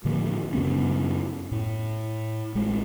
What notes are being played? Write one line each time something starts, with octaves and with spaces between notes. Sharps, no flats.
A2 D3 F3 A#3
F#2 C#3 B3 C#4
A2
A1 G#3